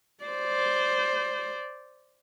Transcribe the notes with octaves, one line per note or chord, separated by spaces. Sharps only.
C5 D5